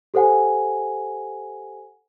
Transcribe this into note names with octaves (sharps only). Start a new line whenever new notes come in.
G4 A4 C5 F#5 G#5